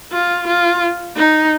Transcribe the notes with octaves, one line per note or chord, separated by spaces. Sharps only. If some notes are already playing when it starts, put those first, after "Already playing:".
F4
F4
D#4